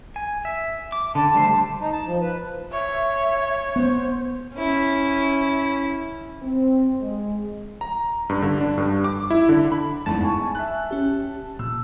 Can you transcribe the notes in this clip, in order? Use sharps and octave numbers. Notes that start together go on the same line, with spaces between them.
G#5
E5
D6
D3 A5
G3 A3 C5
D#4
A5
F3
B4
C#5 E5
B3 C5
C#4 E4
C4
G#3
A#5
G2
D3
D4
G2
D6
E4
D3
B5
G1 E2 G#2 A5
G#5 C#6
E5 F#6
C#4 G4
A#2 E6